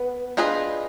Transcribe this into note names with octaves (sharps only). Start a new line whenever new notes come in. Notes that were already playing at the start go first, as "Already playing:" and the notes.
Already playing: B3
D4 F4 G#4 B4 D#5